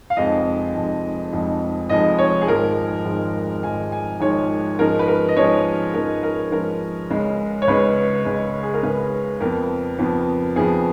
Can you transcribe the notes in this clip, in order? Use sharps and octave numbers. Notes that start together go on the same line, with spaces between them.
F5
F1 F2 F3 G#3 D#4 D#5
F1 F2 F3 G#3 D#4
F1 F2 F3 G#3 D#4
F1 F2 F3 G#3 D#4 D#5
C#5
G#4
G#1 G#2 F3 G#3 A#4
G#1 G#2 F3 G#3
G#1 G#2 F3 G#3 G#5
G#5
G#1 G#2 F3 G#3 C#5
G#2 F3 G#3 C#4 A#4
B4
A#4
D#5
G#2 F3 G#3 C#4 C#5
G#2 F3 G#3 C#4 A#4
A#4
G#2 F3 G#3 C#4 A#4
C#2 C#3 G#3
C#5
C#2 C#3 G#3 B4
C#2 C#3 G#3
G#4
A#4
C#2 C#3 G#3 B4
F2 F3 B3 A#4
F2 F3 B3
F2 F3 B3 G#4